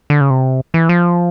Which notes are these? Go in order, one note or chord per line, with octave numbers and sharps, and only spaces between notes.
D3
C#3
C3
E3
F3